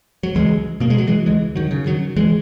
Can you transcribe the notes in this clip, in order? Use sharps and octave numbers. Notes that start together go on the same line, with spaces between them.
F#3
C#2 E3 G#3
B2 A#3
G#3
F#3
E3 G#3
C#2 E3 G#3
D#3 F#3
C#3
D#3 F#3
E3 G#3